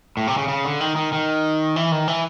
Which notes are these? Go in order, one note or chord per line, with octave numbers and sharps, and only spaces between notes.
A2
C3
C#3
C#3
D3
D#3
D#3
D#3
E3
D#3
E3